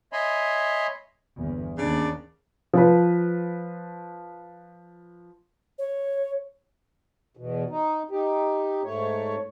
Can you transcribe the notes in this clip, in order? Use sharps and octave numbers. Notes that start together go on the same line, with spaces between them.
C#5 D#5 E5 G#5 B5 C6
G1 E2
D#2 C#3 D4 D5
F3 B4
C#5
E2 B2
D#4
D#4 G4
G#2 A3 C#5